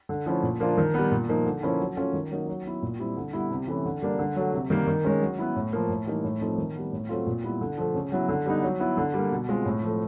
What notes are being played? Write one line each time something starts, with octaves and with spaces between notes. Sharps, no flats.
D3
F3 A3 C#4 E4
A#2
F3 A#3 D4 F4
D#3
G3 B3
A#2
F3 A#3 D#4
D3
F3 A#3 C#4 E4
F#3
A3 C#4 F4
D#3
F#3 A#3 D#4
F#3
B3 E4
A#2
G3 C4 E4
D3
G3 B3 E4
C3
E3 A3 C#4 E4
D3
G3 A#3 D4
D3
F#3 A3
C3
D#3 G3 A#3
D#3
G#3 C#4
F#3
B3 E4
A2
F3 A#3
A2
E3 G3 A#3 D#4
A2
F3 A3 C4 D#4
D#3
G3 B3
A2
F#3 A3 C4 F4
A#2
G3 B3 E4
D3
F3 A3
C#3
F#3 B3 E4
D3
G3 B3 D#4
F#3
B3 E4
D3
G3 A#3
B2
G#3 C4 F4
A2
F3 A3